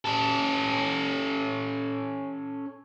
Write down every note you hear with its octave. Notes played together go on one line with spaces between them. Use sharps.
C#4 A4